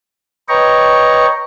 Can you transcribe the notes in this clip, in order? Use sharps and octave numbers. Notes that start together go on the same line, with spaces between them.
B4 C#5 D#5 G5 A#5 C#6